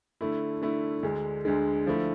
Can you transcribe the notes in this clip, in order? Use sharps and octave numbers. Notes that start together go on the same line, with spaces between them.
D3 A3 E4
D3 A3 E4
D2 D3 G#3
D2 D3 G#3
D3 F3 A3 E4